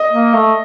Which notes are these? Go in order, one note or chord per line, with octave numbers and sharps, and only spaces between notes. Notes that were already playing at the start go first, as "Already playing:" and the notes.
Already playing: D#5
A#3
A3